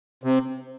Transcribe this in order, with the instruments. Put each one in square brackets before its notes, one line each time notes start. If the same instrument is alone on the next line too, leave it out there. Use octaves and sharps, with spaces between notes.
[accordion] C3